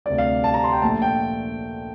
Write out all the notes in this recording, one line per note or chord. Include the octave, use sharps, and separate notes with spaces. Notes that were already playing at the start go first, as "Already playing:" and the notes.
D2 C3 G3 D5
F5
A5
A#5
C6
G5
A#1 A#2 A3 A5
G5